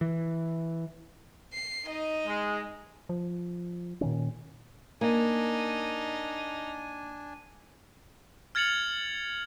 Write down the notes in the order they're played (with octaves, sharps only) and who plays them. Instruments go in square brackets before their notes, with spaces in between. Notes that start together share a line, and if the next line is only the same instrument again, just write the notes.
[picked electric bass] E3
[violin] C7
D#4 D#5
[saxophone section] G#3
[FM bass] F3
[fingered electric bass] A#2 D#3 C#4
[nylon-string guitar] A#3 [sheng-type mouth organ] D4 G#5 [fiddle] D#4
[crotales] F6 G#6 A6 C#7 F7 F#7